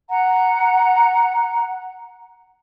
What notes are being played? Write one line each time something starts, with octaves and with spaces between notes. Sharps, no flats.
F#5 A#5